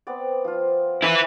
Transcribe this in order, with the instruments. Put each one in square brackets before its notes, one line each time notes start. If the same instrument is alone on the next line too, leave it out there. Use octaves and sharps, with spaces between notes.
[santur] B3 C4 D5
F3 F4
[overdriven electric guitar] E4 B4